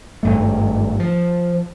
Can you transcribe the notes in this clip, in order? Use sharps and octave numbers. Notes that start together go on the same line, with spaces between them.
G#1 G2 A3
F3